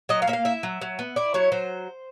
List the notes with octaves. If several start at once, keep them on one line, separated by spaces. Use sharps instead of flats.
F#3 D#5
F5
A#3 E5
F5
E4 E5
F#3
F#3
B3
E4 D5
F#3 C#5
F#3 C5